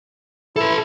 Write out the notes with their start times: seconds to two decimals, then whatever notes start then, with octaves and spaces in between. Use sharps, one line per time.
0.56 E4 A4 B4